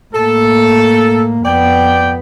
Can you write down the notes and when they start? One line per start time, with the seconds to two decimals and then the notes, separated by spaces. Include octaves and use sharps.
0.14 A2 A#3 A4
1.45 F2 B3 D5 G5